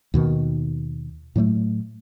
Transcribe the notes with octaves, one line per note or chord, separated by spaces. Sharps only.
D#2 B2 D#3
A2 F#3 G3 A3